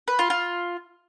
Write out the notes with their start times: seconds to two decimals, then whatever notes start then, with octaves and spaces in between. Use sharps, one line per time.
0.08 B4
0.19 F4
0.30 F4